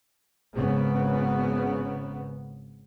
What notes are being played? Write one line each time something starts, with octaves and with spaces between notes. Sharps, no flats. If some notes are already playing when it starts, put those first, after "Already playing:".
G#1 C#3 B3